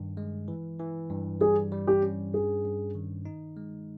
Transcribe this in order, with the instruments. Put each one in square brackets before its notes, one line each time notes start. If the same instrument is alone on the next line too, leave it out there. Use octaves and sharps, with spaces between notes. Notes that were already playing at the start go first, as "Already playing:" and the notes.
Already playing: [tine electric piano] G2 D#3
G#3
E3
E3
G2
[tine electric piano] G3 [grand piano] G#4
[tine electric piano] G3
[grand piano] G4
[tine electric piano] C#4
[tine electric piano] G2 [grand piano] G#4
[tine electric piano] G2
D#3
D#4
G#3